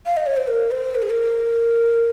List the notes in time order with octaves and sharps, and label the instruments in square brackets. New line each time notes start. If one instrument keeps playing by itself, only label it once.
[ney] F5
D#5
C#5
C5
A#4
C5
A#4
G#4
A#4